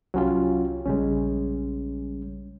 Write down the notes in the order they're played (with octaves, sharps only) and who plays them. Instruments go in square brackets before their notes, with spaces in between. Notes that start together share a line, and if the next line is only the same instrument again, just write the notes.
[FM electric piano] C2 G4 [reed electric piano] F#3 C#4 F4
[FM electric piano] A#1 C#3 G3 [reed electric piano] G#3 C#4